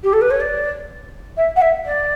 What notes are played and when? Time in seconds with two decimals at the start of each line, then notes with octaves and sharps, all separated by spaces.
0.03 G4
0.13 A4
0.21 B4
0.30 C#5
0.40 D5
1.37 E5
1.56 F#5
1.61 E5
1.85 D5